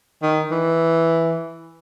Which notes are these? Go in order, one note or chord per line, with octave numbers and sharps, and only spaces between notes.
D#3
E3